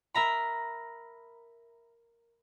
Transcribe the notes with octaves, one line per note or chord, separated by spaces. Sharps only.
A#4 E5 A#5 B5